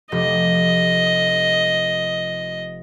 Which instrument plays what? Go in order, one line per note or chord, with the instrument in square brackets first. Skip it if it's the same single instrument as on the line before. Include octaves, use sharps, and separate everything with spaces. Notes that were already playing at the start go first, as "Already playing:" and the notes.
[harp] F1 F3 G4 [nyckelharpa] D#5